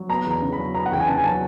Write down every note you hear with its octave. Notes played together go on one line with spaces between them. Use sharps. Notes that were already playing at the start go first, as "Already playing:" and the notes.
Already playing: F#3
B3 A#5
E2 A#5
C#3
B5
F#3
B3 A#5
F#5
E2 G5
G#5
C#3 A5
G#5
F#3 A5